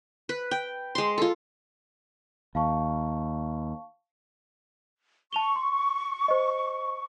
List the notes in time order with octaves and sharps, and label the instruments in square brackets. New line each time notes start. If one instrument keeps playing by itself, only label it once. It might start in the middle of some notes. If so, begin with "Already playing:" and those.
[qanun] B4
G5
G#3 C6
F4 A4
[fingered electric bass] D#2 [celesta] F5 A5 C#6
[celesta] A5 F7 G7 [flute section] C#6
[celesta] C6
C5 D#5